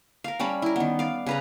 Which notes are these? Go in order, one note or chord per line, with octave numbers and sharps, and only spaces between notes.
A#4 F5
G3 C#4 A5 B5
E4 A#4
D#3 B3
D5 F5
C#3 B4 A#5